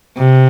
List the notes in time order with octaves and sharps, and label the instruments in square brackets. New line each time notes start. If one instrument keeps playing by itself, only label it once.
[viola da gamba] C3